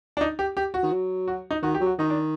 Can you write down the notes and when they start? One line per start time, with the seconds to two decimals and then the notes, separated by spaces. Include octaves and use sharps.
0.17 D4
0.21 D#4
0.39 G4
0.57 G4
0.74 F#4
0.83 D#3
0.93 F#3
1.28 F#4
1.51 D#4
1.63 D#3 F#4
1.75 G4
1.81 F#3
1.86 F#4
1.98 D#3 D#4
2.10 D4